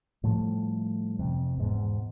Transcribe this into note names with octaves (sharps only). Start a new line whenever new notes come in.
A2 F3 G3 A3
F2 C3
E2 G#2 B2